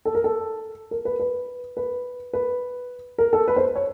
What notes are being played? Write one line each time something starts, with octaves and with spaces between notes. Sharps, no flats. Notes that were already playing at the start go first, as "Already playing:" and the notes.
A4
A#4
A4
A#4
B4
B4
B4
B4
A#4
A4
B4
C5
C#5